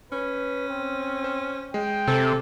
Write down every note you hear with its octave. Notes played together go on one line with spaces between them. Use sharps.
C#4 B4
C4
C5
G#3 G5
C3 C4 A4